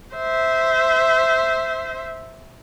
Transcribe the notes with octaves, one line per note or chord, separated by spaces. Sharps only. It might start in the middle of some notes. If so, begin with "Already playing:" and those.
C5 E5